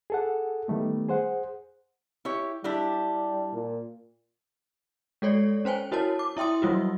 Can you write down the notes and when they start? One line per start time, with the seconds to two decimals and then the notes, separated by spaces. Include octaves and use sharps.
0.10 G#4 A4 F#5
0.68 D#3 G3 A3 B3
1.08 G#4 C5 F#5
2.25 E4 G4 C#5
2.64 G3 D4 E4 G4
3.53 A#2
5.22 G#3 A4 C#5 D5
5.65 C#4 C5 G5 G#5
5.92 E4 F#4 A#4 C#5 A5
6.19 D6
6.37 E4 E5 G5 C6 D#6
6.62 E3 F#3 G3 F4 F#4